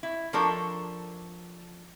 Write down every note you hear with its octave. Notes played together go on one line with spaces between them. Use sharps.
E4
F3 D4 A4 A#4 C#5